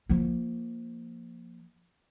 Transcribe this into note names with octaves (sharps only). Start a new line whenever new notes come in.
F3 A#3